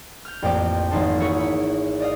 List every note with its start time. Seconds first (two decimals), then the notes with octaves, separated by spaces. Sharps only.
0.25 F6 G6
0.42 A1 F2 A#3 D5 G5 D6
0.91 G#1 F3 A#3 D#4 C5 A5
1.20 E4 F#4 G#4 A#4 C#5 E6
1.40 E4
2.00 D5 D#5 F5